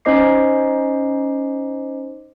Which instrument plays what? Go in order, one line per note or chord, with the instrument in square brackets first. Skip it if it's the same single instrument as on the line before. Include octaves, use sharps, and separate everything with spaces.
[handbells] C#4 D#4 C5 D#5 D6 C7